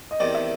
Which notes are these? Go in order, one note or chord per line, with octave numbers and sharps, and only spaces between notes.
D#5
E2 C3 D#3 D5
E5